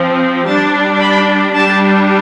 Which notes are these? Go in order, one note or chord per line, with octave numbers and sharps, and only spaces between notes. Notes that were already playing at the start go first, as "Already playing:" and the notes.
Already playing: F3 C4
G3 D4 A5
B5
G3 D4 A5